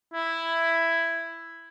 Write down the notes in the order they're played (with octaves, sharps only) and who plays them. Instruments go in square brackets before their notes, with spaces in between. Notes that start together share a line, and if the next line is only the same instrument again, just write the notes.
[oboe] E4